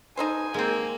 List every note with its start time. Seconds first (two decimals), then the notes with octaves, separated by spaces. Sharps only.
0.17 D#4 A4 C5 G#5
0.54 G#3 A#3 C4